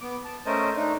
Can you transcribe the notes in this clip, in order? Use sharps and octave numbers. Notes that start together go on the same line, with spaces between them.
B3 D6
A5
A3 C#4 A#4 C5 D#5 A5
A3 D4 D#4